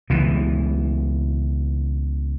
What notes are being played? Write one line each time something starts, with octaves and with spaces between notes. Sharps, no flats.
C#2 B2 E3